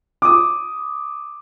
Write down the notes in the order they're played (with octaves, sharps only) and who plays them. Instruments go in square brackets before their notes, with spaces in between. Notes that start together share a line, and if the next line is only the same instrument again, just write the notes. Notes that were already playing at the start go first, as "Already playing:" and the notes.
[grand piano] D6 D#6